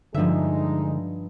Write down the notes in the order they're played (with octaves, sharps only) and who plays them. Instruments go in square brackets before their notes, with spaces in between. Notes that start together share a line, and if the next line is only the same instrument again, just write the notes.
[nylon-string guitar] G2 D4 [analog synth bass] D3 [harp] F3 E5 [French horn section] G#3 D#4